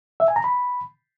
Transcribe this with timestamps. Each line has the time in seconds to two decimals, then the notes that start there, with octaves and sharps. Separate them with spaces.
0.20 E5
0.28 G#5
0.36 A#5
0.44 B5